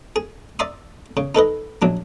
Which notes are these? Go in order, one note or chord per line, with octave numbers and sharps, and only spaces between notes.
G#4
D5 E5 A#5 C6 D#6
C#3
D#4 A4 B4 D#5
A#1 F#3 D4